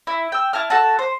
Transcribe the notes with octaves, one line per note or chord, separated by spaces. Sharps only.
E4
G5 E6
E4 A5 F6
F#4 A4 F#5 A5
C5